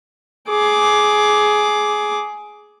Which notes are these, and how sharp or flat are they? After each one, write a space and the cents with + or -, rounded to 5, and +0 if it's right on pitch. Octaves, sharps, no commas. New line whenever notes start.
G#4 +15 D6 +0